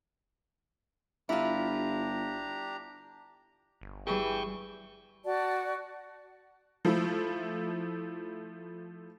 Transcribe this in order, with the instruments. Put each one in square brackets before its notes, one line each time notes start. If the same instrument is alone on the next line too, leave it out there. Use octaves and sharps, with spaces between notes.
[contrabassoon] G1 [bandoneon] D4 G4 A#5 [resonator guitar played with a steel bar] E4 F4
[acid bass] G1
[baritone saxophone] E3 [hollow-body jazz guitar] G3 G#4 [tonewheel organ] G5 C#6
[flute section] F#4 D5 A5
[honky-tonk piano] F3 A3 E4